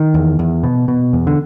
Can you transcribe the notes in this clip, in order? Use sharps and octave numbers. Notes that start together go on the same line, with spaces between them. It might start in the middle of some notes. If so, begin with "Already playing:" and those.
Already playing: D#3
E2
E2
B2
B2
E2
D3